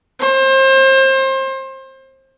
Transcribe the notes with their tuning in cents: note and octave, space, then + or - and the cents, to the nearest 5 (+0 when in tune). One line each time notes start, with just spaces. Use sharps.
C5 +30